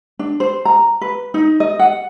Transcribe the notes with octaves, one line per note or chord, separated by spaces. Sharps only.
D4
C5
A#5
B4
D#4
D#5
F#5